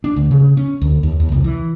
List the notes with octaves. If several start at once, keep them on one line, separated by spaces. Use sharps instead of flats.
D4
D2
C#3
C#4
D2
D#2
D#2
C2
E3